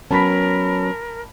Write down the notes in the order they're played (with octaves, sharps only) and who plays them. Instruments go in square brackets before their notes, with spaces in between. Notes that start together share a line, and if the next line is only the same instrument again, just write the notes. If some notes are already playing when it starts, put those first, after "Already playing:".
[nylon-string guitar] F#3 B3 C#4 [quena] A#4 [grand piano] A5 B5 B6